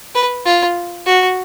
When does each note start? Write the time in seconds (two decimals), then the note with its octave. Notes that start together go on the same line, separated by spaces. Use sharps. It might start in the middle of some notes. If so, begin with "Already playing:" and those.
0.15 B4
0.45 F4
1.06 F#4